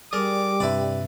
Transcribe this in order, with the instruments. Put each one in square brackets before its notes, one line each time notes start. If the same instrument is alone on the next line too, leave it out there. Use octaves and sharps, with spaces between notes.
[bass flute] G3 [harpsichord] G#4 A#4 [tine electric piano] D5 [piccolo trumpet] D6
[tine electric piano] G2 C3 [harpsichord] E4 B4 D5